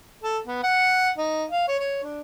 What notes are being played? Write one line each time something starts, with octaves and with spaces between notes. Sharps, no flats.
A4
B3
F#5
D#4
F5
C#5
C#5
D4